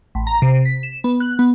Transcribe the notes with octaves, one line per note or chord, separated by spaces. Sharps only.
A1
A#5
C3
B6
E7
B3
F#6
B3